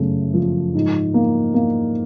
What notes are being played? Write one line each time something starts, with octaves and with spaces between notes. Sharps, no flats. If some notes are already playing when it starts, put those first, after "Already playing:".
Already playing: F#2 C#3 A3
F3
G#2
A#3
A#3